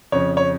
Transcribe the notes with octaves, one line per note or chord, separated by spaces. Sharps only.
F2 C#3 C#5
C#5